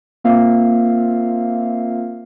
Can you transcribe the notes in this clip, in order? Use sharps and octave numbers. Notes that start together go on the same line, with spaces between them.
A#3 C4 F4 E5 F5